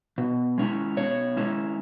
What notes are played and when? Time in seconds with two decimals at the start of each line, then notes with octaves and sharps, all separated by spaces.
0.18 B2
0.58 G#3 C#4 E4
0.97 B2 C#5
1.37 G#3 C#4 E4